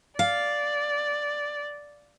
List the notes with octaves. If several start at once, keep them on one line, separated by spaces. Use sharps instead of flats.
D5 F5